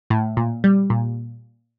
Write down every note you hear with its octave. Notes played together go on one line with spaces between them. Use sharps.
A2
A#2
G3
A#2